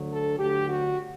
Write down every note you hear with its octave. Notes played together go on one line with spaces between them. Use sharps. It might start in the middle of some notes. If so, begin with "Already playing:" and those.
Already playing: D2 D3 F#3
A4
D2 D3 F#3 G4
F#4